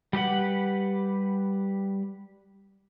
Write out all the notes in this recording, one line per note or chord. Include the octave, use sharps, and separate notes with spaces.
G3 G4 B4 F#5